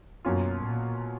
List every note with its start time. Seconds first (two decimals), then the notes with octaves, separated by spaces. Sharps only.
0.25 F#2 B2 F#3 A#3 C#4 F4
0.62 A#2